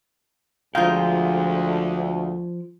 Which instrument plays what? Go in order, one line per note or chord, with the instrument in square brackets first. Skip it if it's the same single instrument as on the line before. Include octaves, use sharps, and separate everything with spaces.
[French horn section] D2 [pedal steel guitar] F3 G5 [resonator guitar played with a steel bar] G#3 F4 [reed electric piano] F5 A#5 G6